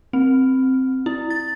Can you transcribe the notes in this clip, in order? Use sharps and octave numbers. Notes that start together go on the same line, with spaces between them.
C4
E4
A6